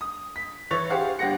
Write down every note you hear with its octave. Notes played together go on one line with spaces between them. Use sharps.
D#6
B6
E3 C#5 C#6 A6 F7
G4 G#4 C5 F5 F#5
G1 G4 F#5 A#6 C#7